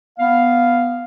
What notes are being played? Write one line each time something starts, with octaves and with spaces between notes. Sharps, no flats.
B3 F5